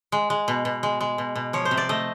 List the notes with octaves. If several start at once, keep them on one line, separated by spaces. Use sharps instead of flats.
G#3
G#3
B2
B2
G#3
G#3
B2
B2
F3 C#5
C5
C3
D5
A3 D#5